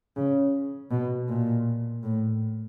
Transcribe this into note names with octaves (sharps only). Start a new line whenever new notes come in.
C#3
B2
A#2
A2